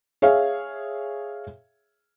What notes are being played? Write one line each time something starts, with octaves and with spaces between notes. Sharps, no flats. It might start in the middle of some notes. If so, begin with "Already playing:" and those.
G#4 C#5 E5 F5